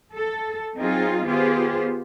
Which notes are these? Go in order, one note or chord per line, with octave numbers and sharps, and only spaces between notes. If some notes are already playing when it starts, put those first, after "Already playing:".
A4
F#3 C4 D#4 F4 G#4
D#3 B3 F4 G4 G#4 C5